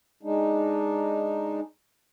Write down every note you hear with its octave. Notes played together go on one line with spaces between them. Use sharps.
G#3 D4 D#4